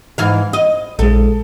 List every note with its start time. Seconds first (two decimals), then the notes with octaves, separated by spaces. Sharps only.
0.18 G#2 E3 F5
0.53 D#5
0.99 A#1 G#3 A4